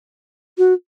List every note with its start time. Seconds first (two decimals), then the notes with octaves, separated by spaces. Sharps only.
0.58 F#4